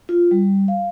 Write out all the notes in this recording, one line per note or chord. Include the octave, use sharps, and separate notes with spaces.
F4
G3
F5